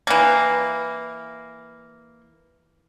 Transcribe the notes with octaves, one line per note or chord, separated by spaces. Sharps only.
E3 A#3